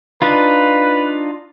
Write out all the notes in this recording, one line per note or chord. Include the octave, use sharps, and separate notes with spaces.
D4 D#4 F4 B4